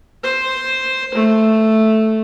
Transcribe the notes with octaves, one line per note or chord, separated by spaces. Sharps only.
C5
A3